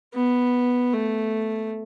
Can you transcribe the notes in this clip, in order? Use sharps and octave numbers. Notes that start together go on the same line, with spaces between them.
B3
A3